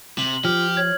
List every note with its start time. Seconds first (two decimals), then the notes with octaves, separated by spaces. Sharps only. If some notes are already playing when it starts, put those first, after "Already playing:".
0.18 C3 F#7
0.45 F3 F4 G4 F6
0.77 C#5 G#6